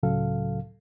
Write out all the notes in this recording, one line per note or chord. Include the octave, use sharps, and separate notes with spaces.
C#2 A2 C#3 F#3 A4 F5